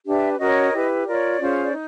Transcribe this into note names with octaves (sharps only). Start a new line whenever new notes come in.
D4 G4 B4 E5
C#4 F#4 A#4 C#5 D#5
E4 G4 B4
F4 A#4 C#5 D5
C#4 F4 G#4 C5
D5
D#4